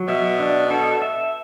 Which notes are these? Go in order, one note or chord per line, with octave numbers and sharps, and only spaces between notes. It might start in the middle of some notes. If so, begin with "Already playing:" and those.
Already playing: F#3
B2 E5
D4
A4
E5